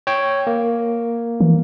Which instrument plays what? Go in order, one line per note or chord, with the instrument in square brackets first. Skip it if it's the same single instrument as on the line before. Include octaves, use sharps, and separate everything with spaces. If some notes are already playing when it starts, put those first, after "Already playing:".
[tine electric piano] C#5 G5
A#3
[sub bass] E3